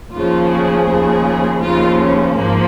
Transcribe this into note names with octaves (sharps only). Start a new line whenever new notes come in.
D#2 C#3 F3 F4
G#4
D#2 C#3 F3
D#2 C#3 F3 F4
C#4
G#2 F3 A#3